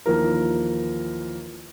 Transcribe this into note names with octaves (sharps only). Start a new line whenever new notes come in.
D#2 E3 F3 A#4